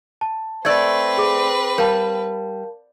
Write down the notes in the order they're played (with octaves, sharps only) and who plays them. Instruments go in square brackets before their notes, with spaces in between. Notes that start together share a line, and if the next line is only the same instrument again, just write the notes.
[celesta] A5
[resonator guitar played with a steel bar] A3 D5 [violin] C4 B4 [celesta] E6 G#6
[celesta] G#4 D6
[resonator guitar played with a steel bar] G3 [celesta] A#4 F5 A5